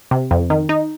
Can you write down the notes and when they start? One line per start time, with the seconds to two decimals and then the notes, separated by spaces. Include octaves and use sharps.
0.11 C3
0.31 F2
0.50 D#3
0.69 D#4